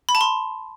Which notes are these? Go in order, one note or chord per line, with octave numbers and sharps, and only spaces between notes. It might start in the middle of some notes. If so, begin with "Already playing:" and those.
B5
A5
C6